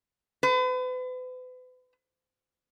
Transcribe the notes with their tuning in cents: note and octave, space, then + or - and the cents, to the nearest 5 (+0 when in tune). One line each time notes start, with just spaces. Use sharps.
B4 +40